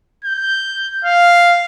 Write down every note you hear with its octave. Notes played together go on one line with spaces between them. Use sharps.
G6
F5